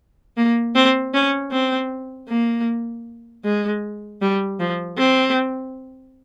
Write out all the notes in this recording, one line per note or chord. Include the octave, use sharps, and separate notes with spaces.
A#3
C4
C#4
C4
A#3
G#3
G3
F3
C4